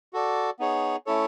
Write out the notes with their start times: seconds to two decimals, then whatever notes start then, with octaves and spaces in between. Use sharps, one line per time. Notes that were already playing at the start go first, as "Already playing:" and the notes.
0.13 F#4 A4 D5
0.59 B3 D#4 G#4 C#5
1.06 A3 C#4 E4 A4 C#5